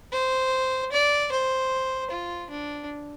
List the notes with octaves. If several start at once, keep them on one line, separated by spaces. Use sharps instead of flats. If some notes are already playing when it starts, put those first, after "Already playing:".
C5
D5
C5
F4
D4